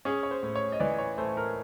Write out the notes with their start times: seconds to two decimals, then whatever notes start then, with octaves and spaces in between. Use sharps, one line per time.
0.05 C#4 G#4
0.23 C#5
0.31 C5
0.43 A2
0.56 C#5
0.72 D#5
0.80 E3 D5
0.99 C#5
1.18 A3 C5
1.37 A#4